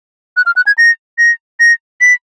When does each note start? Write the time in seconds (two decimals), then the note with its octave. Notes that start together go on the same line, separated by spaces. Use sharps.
0.37 F#6
0.46 F6
0.56 F#6
0.67 G#6
0.78 A#6
1.18 A#6
1.60 A#6
2.01 B6